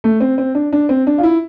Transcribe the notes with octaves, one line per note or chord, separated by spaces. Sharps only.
A3
C4
C4
D4
D4
C4
D4
F4
E4